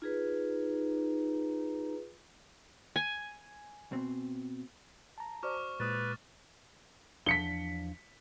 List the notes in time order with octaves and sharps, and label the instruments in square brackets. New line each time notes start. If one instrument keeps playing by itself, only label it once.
[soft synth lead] D#4 [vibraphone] F4 G#4 B4
[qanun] G#5
[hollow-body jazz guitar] B2 C4
[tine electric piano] A5 A#5
[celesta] F#4 C5 D5 [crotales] C#6 D6 F6
[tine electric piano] A#2 G#3 [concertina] B4 [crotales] D#6 A6
[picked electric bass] E2 F3 D4 [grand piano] B6 C#7 G7